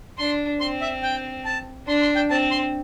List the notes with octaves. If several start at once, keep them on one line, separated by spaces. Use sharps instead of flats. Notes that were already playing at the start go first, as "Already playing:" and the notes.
D4 C6
C4 C6
E5
G5
A5
D4 C6
C6
G5
C4 A5
C6